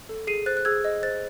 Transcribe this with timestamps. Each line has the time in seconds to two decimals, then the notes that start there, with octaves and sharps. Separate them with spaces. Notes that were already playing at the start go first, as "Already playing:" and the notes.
0.09 A4
0.27 G#4 C7 D#7
0.46 C5 F#6 A6
0.57 F#6
0.65 G#4 E6 G#6
0.84 D#5
1.03 C5 F#6 A6